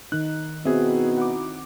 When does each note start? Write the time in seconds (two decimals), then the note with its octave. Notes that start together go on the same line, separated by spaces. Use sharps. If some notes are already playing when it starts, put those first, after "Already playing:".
0.12 D#3 D#4 F#6
0.65 B2 C4 D#4 E4 F#4 G#4 E5
1.18 F#5 D6